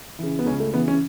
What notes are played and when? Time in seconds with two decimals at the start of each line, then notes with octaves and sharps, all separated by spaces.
0.19 C#3 E3
0.39 B3
0.46 C#2 C#4
0.60 A3
0.74 C#3 E3 B3
0.88 C#4